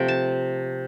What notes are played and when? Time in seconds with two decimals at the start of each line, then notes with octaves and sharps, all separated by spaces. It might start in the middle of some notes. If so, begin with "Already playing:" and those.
Already playing: C3 F3 A3 G5
0.08 A5